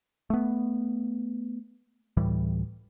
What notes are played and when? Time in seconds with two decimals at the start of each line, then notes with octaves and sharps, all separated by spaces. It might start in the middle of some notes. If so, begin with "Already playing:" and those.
0.30 A3 B3
2.17 D2 A2 E3 G3